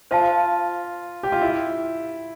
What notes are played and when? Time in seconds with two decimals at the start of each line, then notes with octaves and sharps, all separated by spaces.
0.11 F4 C5 F5 A5
1.23 G4
1.32 F4
1.42 E4